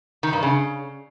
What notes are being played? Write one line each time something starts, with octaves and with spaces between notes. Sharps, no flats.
D#3
G2
C#3